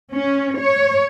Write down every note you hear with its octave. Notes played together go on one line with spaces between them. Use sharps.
C#4
C#5